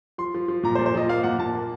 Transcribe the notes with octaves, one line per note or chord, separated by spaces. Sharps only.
F3 C6
F3
F3
A#2 A#5
C5
A#2
C5
F3 D#5
A#3 F5
A#2 F#5
A#2 A5
A#3